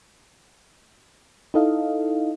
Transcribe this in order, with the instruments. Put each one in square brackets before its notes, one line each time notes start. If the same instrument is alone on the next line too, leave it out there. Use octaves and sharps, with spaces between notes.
[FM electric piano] D#4 E4 A4 D#5 F5